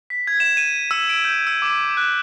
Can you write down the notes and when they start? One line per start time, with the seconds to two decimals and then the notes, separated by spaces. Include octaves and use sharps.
0.10 B6
0.27 G#6
0.40 E7
0.57 D#7
0.91 E6
1.09 D7
1.25 G6
1.47 E6
1.62 D6
1.97 F#6